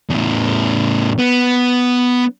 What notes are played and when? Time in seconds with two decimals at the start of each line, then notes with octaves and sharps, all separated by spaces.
0.10 E2 A2
1.19 B3